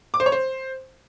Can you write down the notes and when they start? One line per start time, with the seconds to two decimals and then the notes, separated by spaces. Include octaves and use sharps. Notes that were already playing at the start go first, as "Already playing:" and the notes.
0.14 D6
0.20 C5
0.26 C#5
0.32 C5